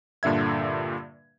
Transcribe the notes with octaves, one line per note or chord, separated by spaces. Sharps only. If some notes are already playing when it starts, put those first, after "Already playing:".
G2 A#2 D3 E5 G#6